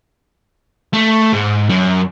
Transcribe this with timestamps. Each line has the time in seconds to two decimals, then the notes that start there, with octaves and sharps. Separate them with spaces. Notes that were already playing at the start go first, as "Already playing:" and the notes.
0.94 A3
1.33 G#2
1.69 F#2